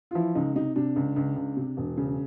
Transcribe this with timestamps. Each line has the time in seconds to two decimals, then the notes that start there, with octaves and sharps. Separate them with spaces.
0.11 F4
0.15 E3 F3 E4
0.35 C#2 D#4
0.55 C3 D#4
0.76 C3 D4
0.96 C#2
1.16 C#2
1.36 C#2
1.57 C3
1.77 E1
1.97 C#3